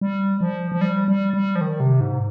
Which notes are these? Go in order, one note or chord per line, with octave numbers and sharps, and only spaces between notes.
G3
F3
F3
G3
G3
G3
F3
D#3
C3
G#2